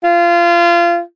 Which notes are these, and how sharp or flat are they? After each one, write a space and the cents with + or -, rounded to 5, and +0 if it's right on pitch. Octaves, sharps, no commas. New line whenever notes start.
F4 -25